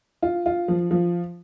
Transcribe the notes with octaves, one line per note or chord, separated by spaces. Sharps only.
F4
F4
F3
F3